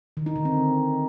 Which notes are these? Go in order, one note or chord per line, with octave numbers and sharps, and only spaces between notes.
D#3
D#4
D3
C4